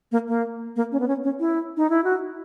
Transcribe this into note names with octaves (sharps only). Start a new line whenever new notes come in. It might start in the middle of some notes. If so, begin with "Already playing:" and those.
A#3
A#3
A#3
C#4
B3
C#4
C#4
E4
D#4
E4
F#4